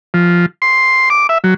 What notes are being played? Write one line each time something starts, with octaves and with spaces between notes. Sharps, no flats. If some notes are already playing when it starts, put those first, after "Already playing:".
F3
C6
D6
E5
F#3